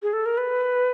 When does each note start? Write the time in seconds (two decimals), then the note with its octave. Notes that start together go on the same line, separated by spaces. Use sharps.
0.02 G#4
0.13 A4
0.26 A#4
0.37 B4